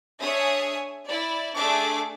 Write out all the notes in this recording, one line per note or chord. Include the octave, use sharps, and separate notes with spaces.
D4 G#4 C#5 E5 D#6
E4 D5
A3 D4 G#4 E5 D6